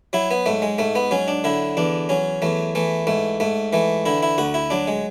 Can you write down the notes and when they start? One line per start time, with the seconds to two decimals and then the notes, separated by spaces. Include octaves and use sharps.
0.13 F#3 E4
0.31 B3
0.46 G#2 A3
0.62 G#3
0.78 G#2 A3
0.95 B3
1.11 F#3 C#4
1.28 D4
1.44 D3 E4
1.77 E2 D4
2.09 F#3 C#4
2.42 E2 A3
2.75 E3 A3
3.07 G#2 A3
3.40 G#2 A3
3.73 E3 A3
4.06 D3 E4
4.23 E4
4.38 D2 F#4
4.54 E4
4.70 F#3 D4
4.88 G#3